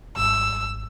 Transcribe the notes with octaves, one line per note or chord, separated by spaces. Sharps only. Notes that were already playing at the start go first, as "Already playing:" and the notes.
G#1 G3 E6